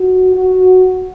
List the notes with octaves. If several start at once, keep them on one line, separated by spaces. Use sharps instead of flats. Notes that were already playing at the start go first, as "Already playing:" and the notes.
Already playing: F#4
F#4